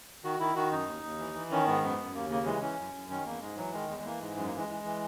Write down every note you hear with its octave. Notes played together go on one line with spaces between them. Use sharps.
D#3 F#4
D#3 E4
D#3 F#4
F#2 D#4
D#2
D#2
E3
E3
D#3 C#4
G#2 B3
F#2 B3
F#2
D#2 A#3
C#3 A#3
E3 G#3
E3 C#4
F#2
F#2
D#3 C#4
E2 A#3
G#2 G#3
E3 F#3
D#3 G#3
E2 G#3
G#3
E3 A#3
G#2 G#3
F#2 G#3
A#3
E3
G#3
E3
E3